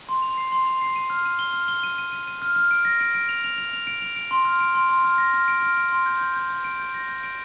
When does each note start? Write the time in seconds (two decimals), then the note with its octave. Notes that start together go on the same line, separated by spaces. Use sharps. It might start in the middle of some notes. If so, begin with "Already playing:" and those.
0.09 C6
0.22 F7
0.38 C7
0.52 C6
0.67 F7
0.81 C7
0.96 D#7
1.10 F6
1.25 D#7
1.39 G7
1.53 F6
1.68 G7
1.83 D#7
1.98 D#7
2.12 D#7
2.28 D#7
2.42 F6
2.56 F6
2.71 D7
2.85 A#6
3.01 D7
3.14 D7
3.29 F7
3.44 F7
3.58 F7
3.73 F7
3.87 D7
4.02 F7
4.16 D7
4.31 C6
4.45 F6
4.60 D7
4.75 C6
4.90 C6
5.04 F6
5.18 A#6
5.34 F6
5.48 D7
5.62 F6
5.77 D7
5.92 C6
6.06 G6
6.21 G6
6.36 G6
6.50 G6
6.64 D7
6.79 G6
6.94 A#6
7.08 G6
7.23 D7